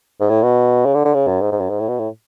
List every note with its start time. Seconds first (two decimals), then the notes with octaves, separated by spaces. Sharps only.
0.20 G#2
0.30 A2
0.43 B2
0.86 C#3
0.94 D3
1.05 D3
1.14 C#3
1.27 F#2
1.41 G#2
1.52 G#2
1.60 F#2
1.69 G#2
1.80 A2
1.88 B2
1.98 A2